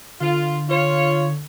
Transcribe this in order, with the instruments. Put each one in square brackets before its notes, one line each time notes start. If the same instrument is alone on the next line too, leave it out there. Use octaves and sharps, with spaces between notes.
[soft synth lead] D3 [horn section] F4
[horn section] F4 C#5